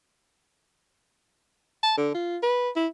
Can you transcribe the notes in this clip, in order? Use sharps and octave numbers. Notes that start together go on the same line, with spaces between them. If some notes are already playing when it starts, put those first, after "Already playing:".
A5
D3
F4
B4
E4